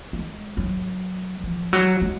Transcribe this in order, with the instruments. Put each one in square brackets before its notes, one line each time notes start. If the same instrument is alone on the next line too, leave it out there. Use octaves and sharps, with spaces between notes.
[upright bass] G#3
F#3
F3
F#3
G#3